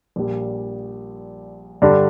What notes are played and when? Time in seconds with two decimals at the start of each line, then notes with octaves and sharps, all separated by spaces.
0.16 A#1 A#2 G3
1.82 G2 D3 G3 D4